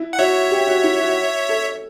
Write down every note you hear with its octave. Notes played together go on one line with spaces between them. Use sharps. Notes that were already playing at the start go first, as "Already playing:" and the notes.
Already playing: E4
F#5
F#4 C#5 E5
G4
F#4
E4
F#4
A4